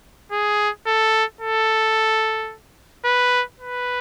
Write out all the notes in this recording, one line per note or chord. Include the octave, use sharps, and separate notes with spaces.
G#4
A4
A4
B4
B4